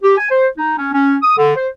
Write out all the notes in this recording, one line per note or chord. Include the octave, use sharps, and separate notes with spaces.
G4
G#5
C5
D#4
C#4
C#4
D#6
D3
C5